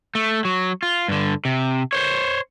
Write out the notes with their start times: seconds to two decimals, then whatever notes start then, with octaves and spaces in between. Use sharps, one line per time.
0.15 A3
0.45 F#3
0.83 F4
1.08 G2 D3
1.45 C3
1.93 C5 C#5